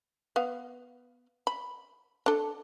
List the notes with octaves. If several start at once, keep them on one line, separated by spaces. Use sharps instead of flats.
B3 F5
B5
D4 A4